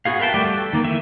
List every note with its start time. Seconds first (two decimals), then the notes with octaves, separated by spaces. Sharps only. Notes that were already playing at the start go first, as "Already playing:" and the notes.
0.05 B3 F#4 G#4 F5
0.19 A#4 B4 E5 G5 A5
0.34 G3 A3 F#4 G4 D5
0.57 A4
0.73 D#3 A#3
0.85 E3 E5